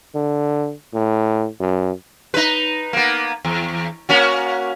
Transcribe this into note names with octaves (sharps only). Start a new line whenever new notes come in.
D3
A2
F#2
D#4 B4
A#3 B3
E2
A#3 C#4 F#4